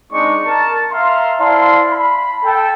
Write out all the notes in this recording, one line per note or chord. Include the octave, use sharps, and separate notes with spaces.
G#3 C4 D4 D#4 D5 C#6
A#4 A5
E5 F5 A#5 C6
E4 C5 D5 F5 A5 C6
B5
A4 G5